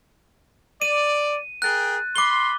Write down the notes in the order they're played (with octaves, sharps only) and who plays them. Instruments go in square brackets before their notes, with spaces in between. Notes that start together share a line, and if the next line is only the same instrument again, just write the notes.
[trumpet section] D5 [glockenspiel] D#7
[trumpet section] G#4 A#4 G5 [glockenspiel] F#6 A6
[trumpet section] B5 C6 [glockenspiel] D6 G7